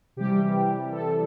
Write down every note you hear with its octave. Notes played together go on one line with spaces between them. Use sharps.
C3 E3 G3 G4
A4